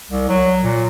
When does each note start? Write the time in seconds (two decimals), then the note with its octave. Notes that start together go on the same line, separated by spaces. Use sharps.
0.09 C2
0.29 F#3
0.64 A#2